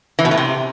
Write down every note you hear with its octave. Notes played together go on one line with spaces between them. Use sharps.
E3
B2
A2
C3